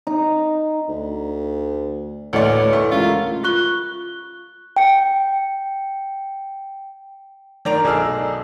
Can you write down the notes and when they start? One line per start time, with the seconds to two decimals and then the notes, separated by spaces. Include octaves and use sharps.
0.07 D#4
0.89 D2
2.33 D2 A2 E3 A3 A#3 C#5 D5
2.73 G2 A3
2.91 C#2 D3 F4 G4 A#4
3.43 F4 C#6 F#6 G7
4.77 G5 C#7
7.65 D#3 D4 D5 A#5 D7 F7
7.84 B1 G#4 A4 D#5 E6 F6